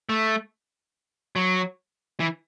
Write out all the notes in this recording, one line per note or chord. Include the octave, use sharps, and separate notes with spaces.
A3
F#3
E3